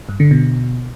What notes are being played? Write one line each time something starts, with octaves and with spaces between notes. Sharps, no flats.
G2
D3
B2